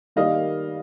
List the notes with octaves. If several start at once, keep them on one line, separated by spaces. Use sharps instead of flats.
D#3 G3 A#3 D#5 F5